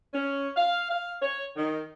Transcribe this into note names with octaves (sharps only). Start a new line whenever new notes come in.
C#4
F5
F5
C#5
D#3